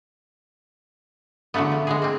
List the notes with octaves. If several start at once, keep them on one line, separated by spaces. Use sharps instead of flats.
D3 E3 F#3 A3 B3
F3
G#3 B3 G#4
A#3 C4